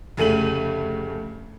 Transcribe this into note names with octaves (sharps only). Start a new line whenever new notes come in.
F1 C#3 A3 D#7 F#7